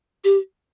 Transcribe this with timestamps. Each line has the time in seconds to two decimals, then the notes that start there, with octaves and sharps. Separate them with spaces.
0.24 G4